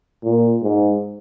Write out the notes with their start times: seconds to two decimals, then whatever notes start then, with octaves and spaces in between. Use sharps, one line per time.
0.24 A#2
0.63 G#2